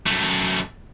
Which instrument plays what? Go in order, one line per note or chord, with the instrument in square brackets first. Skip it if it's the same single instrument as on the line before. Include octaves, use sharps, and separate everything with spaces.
[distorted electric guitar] F#2 A3